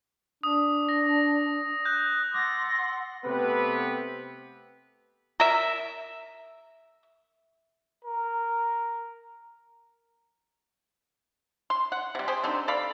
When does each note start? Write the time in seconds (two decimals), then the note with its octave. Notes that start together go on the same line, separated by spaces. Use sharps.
0.43 D4 D#6
0.89 A#6
1.85 F#6 G6
2.34 F#5 C6 D6 E6 A6 A#6
3.25 C3 A3 B3 C4 G4 B4
5.40 A#4 E5
8.05 A#4
11.70 C6
11.92 F#5
12.15 C3 G3
12.28 G4 G#4 C5
12.43 D3 G3 C4 D#4
12.68 A4 D5 F5 B5